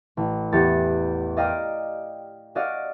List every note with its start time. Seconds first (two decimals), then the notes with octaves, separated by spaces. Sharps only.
0.17 A1
0.52 E2 G4 A6 C#7
1.37 D5 D#5 F5 G5 A#5
2.55 C#4 F#4 D5 D#5 F5